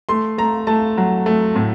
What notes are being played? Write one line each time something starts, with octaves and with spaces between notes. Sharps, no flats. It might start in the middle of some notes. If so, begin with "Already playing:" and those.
A3 C6
A3 A#5
A3 A5
F#3
A3
A2